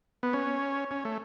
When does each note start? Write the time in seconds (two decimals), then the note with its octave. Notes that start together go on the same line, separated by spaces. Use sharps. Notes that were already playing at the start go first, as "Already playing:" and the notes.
0.23 B3
0.33 C#4
0.91 C#4
1.05 A3